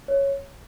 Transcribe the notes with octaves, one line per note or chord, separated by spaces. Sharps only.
C#5